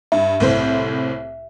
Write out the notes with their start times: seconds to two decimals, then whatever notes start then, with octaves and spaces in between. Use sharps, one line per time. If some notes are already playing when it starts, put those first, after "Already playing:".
0.12 G2 E5
0.40 C2 A2 C5